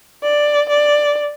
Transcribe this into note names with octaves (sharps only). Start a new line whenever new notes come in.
D5
D5